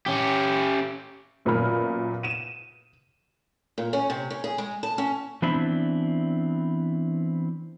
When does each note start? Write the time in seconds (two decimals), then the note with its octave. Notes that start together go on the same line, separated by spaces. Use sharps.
0.06 C#4 G4
1.45 F#2 A#2 B3 A#4 B5 F6
2.23 D#7 E7
3.78 A#2
3.93 C#4
4.10 C3
4.30 C#4
4.44 G#4
4.58 G#3
4.83 A5
4.98 C#4
5.42 E3 B3 C4 D4 E4